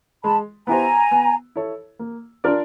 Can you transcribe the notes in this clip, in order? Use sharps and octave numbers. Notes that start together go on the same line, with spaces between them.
G#3 A5 B5
B3 E4 G4 C5 G#5 A#5
B3
E4 A4 C#5
A#3
D4 F4 A#4 D5